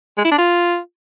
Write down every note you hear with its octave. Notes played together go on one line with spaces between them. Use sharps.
G#3
E4
D4
F4